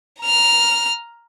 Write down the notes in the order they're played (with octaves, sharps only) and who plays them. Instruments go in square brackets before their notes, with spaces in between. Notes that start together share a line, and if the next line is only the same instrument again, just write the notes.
[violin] A#5 F6